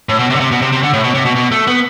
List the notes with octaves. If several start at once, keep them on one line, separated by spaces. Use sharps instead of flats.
A2
B2
C3
D3
C3
B2
C3
C3
D3
A2
B2
C3
B2
B2
A3
B3